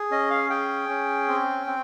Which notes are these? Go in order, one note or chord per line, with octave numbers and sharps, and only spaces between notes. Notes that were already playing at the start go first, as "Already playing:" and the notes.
Already playing: G#4
C#4 D#5
F5
G#4 G5
C#4
C4
C4